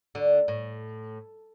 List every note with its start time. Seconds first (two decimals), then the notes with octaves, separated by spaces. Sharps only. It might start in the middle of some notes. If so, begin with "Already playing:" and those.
0.15 D2 D3
0.48 A2